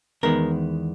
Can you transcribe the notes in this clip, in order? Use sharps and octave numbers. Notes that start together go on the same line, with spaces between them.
E2 D#3 G#3 B3 A#4